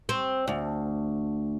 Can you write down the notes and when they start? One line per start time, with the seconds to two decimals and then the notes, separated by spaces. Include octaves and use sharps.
0.09 C4
0.48 D2